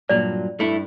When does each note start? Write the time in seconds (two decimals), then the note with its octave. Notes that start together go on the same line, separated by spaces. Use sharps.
0.09 G2 A#2 F#3 D5
0.60 G2 A3 E4